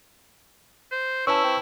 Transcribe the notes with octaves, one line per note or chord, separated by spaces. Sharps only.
C5
C#4 E4 B4 A5 C#6 E6
C4